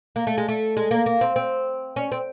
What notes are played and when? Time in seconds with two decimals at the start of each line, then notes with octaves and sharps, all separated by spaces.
0.16 A#3
0.27 A3
0.38 G#3
0.48 A3
0.77 G#3
0.91 A#3
1.06 A#3
1.21 C4
1.36 C4
1.96 C#4
2.12 C4